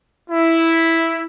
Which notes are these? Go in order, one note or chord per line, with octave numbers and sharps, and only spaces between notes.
E4